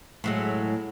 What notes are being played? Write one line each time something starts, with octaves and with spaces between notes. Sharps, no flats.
A2 F#3 G#3